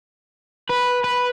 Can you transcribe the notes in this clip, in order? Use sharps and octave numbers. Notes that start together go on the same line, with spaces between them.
B4
B4